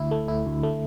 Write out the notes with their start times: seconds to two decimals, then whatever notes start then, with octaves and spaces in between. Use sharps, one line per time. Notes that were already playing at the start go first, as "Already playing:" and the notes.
Already playing: D2 E4
0.11 A3
0.28 E4
0.46 D2
0.63 A3